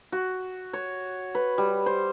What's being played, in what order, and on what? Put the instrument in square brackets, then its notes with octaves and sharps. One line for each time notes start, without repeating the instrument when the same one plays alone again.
[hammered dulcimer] F#4
C#5
B4
G3
C5